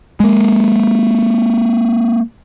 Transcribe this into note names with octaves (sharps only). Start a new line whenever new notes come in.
G#3 A#3